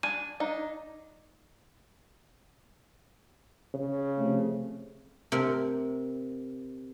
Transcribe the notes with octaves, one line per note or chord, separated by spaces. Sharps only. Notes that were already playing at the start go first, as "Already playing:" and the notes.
D4 G#5 A5 D#7
D4 D#4
C#3
C3 F3 A3
C3 A#4